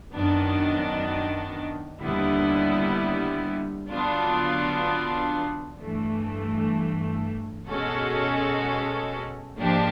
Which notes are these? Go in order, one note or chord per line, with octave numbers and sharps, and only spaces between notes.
F#2 D#3 F#3 B3 D4
D#2 D3 G3 B3 E4
D3 F#3 B3 D4 F4
G2 E3 A3
B2 G#3 C#4 F#4 A4
G#2 F3 A#3 D4 G4